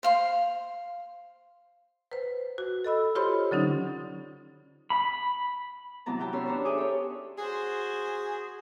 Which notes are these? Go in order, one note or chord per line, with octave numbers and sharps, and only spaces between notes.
C5 F5 C6
B4 C5
F#4
A4 D#5 B5 E6
F4 G4 C5 C#5 B5 C6
D3 F#3 C#4 D#4
B5
C3 E3 F#3 B3 A5 A#5
F#4 G4 G5 A5 A#5
C#4 B4 C#5 C6 E6
D4 C5 C#5
G#4 A4 E5 G#5 D6 D#6
G4 C#5
F#4 G#4 C5